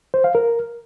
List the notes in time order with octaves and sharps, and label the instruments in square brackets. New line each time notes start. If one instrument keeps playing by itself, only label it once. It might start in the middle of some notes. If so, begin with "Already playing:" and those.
[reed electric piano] C5
F5
A#4